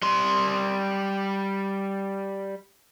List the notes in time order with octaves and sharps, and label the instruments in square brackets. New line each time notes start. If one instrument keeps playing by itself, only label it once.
[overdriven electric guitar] G3 C6